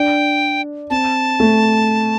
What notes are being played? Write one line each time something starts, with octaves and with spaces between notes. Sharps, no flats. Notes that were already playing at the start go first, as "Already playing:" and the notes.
Already playing: D4 G5
C4 A5
A3